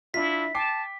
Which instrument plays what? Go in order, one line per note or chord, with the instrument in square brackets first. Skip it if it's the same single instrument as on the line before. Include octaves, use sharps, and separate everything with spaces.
[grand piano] D4 F4 [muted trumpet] E4 [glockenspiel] B6
[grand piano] G5 D6 C7 [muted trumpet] A5